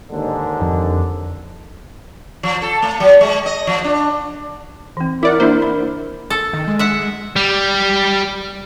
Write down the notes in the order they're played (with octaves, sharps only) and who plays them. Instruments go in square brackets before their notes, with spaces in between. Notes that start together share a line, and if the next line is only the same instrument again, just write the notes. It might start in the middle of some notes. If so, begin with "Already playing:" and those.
[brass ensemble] D#2 G#2 D3
[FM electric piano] F2
[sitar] F3
A4
A3
F#3
G#3
D#5
F3
D4
[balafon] E3 C4
[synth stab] E4 D5 F#5 [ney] A#4 [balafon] D6
[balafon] A#3 D4 [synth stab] E4 C5
[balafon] B5
[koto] A4
[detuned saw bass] D#3
G#3
[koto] E5 F#5
[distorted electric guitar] G3